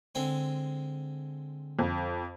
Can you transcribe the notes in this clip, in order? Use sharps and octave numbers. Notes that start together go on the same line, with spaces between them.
D3 G#3 C4
F2